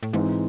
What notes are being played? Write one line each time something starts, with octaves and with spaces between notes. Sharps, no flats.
A2
G#2 E3 G#3 C4 D#4